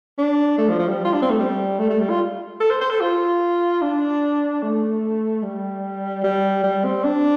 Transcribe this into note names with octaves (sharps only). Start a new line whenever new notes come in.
D4
A3
F3
F3
G3
F4
D4
C4
A3
G3
A3
A3
G3
F4
A4
C5
C5
A4
F4
D4
A3
G3
G3
G3
C4
D4